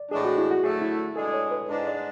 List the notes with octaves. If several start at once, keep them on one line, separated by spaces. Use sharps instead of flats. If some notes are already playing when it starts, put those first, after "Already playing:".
Already playing: D5
A2 E3 G#3 D4 G#4
F#4
E4
F#4
D3 F#3 A3 G#4
E4
B2 G#3 D4 G#4 A4
C#5
B4
G#2 G#3 D4
D5